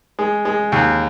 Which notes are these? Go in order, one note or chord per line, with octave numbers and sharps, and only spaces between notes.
G#3
G#3
D#2